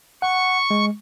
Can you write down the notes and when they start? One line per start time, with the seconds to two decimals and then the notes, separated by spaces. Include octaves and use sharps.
0.22 F#5 C#6
0.71 G#3